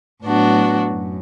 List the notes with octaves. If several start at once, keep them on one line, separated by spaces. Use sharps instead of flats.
A2 F#3 B3 D4 F#4
F#2